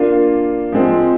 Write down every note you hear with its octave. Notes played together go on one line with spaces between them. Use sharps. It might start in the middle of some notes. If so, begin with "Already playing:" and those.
Already playing: A#3 D4 F4
F3 G#3 C4